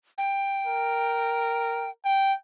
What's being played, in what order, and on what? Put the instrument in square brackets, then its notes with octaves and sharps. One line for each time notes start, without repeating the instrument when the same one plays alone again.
[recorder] G5
[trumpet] A#4
G5